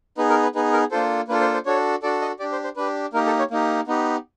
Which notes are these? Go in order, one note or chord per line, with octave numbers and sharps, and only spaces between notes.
B3 D#4 G#4 B4
A#4
B4
B3 D#4 G#4 B4
A#4
A#3 D4 F4 A4 C5
A#3 D4 F4 A4 B4
C5
C5
D4 F#4 A4 C#5
D4 F#4 A4 D5
D#5
D4 G4 D5
C5
C5
D4 G4 B4
A#3 D#4 G4 A#4
A4
C#5
A#3 D#4 G4
B3 D#4 G4